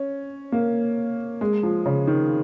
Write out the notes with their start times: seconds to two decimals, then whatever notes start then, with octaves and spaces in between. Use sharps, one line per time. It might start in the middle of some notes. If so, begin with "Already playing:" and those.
Already playing: C#4
0.52 A#3
1.41 G#3
1.63 F3
1.86 C#3
2.07 D#3